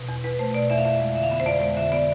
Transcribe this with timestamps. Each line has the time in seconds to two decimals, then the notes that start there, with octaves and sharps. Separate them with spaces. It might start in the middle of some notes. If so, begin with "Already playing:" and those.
Already playing: B2
0.09 E2
0.24 E2 B4
0.39 A3 C5
0.54 B2 D5
0.70 E2 E5
0.78 F5
0.85 F2 E5
1.00 G#3
1.15 D3 E5
1.23 F5
1.30 B3 E5
1.40 C5
1.46 F2 D5
1.61 G#3 C5
1.77 D3 E5
1.92 B3 D5